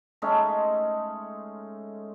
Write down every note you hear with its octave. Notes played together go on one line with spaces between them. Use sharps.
G#3 A3 C#4 D#4